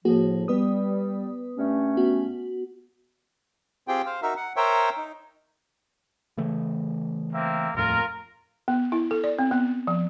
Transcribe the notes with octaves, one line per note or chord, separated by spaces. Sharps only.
A2 F3 A#3 F#4 G#4
G3 B3 B4 D#6
G2 A3 C#4
B3 F#4
C4 F4 G4 G#4 G5
C5 F5
D#4 F#4 A#4 E5
F#5
A#4 C5 C#5 E5 G5
D#4
C#3 E3 A3
A#3 C4 E5
D#1 F2 A2 F4 A#4
B3
E4
A4
D5
C4
B3
F3